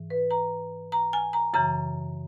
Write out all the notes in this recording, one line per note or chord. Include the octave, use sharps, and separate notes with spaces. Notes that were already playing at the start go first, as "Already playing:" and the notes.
Already playing: G#2 E3
B4
A#5
A#5
G#5
A#5
F#2 C#3 E3 A#5